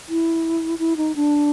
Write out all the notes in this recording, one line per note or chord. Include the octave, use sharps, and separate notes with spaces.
E4
E4
D#4
D4